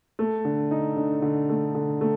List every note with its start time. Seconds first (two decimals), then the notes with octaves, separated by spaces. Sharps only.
0.19 A3
0.45 D3
0.71 D#4
0.96 D3
1.22 D3
1.49 A3
1.75 D3
2.01 A3